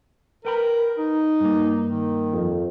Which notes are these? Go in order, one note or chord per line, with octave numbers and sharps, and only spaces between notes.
A#4 B4 G5 B5
D#4
G2 A#3
D#3
F2